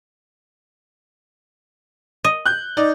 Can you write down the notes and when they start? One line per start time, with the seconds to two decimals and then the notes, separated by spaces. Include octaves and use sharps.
2.24 D#5
2.46 F#6 G6
2.77 D#4 D5